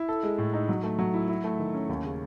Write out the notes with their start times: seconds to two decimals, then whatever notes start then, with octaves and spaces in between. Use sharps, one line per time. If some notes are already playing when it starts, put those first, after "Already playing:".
Already playing: E4
0.09 A4
0.23 G#3
0.38 A2
0.54 D#4
0.69 F#3
0.83 A3
0.99 F#3
1.14 E4
1.28 E4
1.44 A3
1.59 D#3
1.74 C#4
1.89 D#2
2.04 C#3